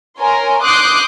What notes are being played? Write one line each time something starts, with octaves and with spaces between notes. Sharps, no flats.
A#4 C#5 G#5 A#5 C6
C6 D6 D#6 F#6 G6 C7